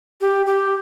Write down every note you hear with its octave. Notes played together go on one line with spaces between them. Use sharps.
G4
G4